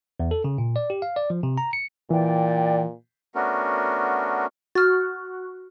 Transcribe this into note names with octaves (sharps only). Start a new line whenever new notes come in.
E2
A4
C#3
A#2
D5
G4
F5
D5
F3
C3
A#5
C#7
A#2 E3 D5 G5
A3 B3 C#4 D4 F#4 A#4
F#4 F6 A6